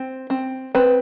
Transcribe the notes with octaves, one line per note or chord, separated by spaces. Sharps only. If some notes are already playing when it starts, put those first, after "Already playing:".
Already playing: C4
C4
C4 B4